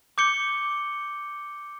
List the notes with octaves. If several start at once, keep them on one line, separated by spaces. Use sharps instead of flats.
D6 G6 C#7 G7